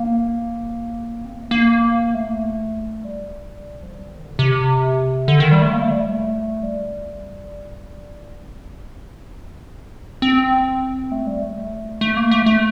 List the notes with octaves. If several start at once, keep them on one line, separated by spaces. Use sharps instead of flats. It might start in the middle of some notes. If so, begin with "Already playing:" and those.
Already playing: A#3
C4
A#3
A3
A#3
A3
G3
F3
G3
D#3
C3
D3
C3
D3
D#3
G3
A3
A#3
A3
G3
A3
G3
C4
C4
A3
G3
A3
A3
A#3
A3
A3